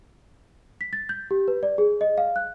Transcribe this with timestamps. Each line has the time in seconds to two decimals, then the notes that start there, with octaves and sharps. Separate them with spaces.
0.81 B6
0.93 A6
1.09 G6
1.31 G4
1.48 B4
1.63 D5
1.78 G#4
2.01 D#5
2.18 F5
2.36 F#6